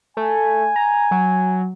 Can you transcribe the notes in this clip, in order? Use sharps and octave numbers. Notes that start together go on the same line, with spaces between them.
A3 G#5
A#5
F#3